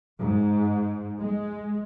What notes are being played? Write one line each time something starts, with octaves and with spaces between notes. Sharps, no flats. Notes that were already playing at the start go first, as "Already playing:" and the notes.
G#2
G#3